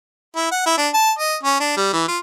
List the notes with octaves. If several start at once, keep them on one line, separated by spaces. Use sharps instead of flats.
E4
F#5
E4
D4
A5
D#5
C#4
D4
G3
E3
F4